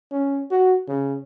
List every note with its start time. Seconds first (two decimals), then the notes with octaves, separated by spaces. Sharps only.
0.11 C#4
0.51 F#4
0.88 C#3